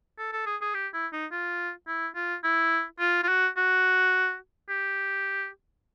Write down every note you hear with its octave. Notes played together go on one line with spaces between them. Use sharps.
A4
A4
G#4
G#4
G4
E4
D#4
F4
E4
F4
E4
F4
F4
F#4
F#4
G4